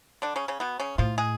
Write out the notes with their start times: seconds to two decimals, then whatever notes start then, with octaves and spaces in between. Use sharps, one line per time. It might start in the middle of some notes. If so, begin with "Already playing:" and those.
0.22 D3 D4
0.36 C#3 C#4
0.48 C#3 C#4
0.60 B2 B3
0.80 C#3 C#4
0.98 A2 F3 F4
1.18 G#3 G#4